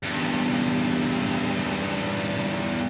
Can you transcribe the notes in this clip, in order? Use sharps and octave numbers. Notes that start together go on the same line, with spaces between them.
E2 G2